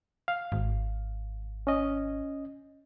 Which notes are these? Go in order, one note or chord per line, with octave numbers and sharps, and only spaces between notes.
F5
G#1
C#4 D#5